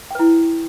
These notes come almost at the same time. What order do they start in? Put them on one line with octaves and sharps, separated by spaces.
G5 B4 E4